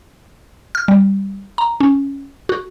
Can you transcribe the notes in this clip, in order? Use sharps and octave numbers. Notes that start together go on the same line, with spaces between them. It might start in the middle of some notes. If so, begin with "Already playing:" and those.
F6
G3
A#5
C#4
F#4